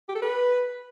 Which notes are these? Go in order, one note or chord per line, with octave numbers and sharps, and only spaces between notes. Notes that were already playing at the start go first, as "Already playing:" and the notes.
G4
A4
B4